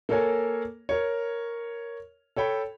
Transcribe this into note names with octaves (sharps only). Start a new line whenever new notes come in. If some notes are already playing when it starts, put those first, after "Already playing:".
A#3 A4 A#4 C#5 G#5
A#4 C#5
A4 C#5 G5 B5